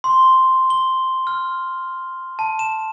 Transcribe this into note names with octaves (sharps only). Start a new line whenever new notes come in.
C6
G7
F6
A5
E7